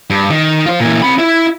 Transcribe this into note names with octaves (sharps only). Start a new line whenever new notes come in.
G2
D#3
F4 C5
A#2 E3
C4 B5
E4